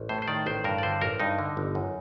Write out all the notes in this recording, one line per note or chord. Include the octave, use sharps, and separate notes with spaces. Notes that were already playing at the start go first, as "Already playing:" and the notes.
Already playing: A1
A2 C5
C5
D#3 D5
A1 C5
G2 A#4
D5
D3 C5
A1 A#4
G2 D#4
D3
G1
F#2